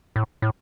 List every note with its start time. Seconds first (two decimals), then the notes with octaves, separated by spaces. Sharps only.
0.16 A2
0.42 A2